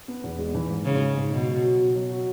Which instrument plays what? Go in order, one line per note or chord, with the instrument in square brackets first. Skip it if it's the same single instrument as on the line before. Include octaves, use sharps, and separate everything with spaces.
[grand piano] B3
E2
G#3
E3
G#2
[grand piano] G#2 [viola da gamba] C#3
[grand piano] G#3
G#2
[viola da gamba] B2 [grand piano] F#4
[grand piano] F#3
F#4
B2
F#3
F#4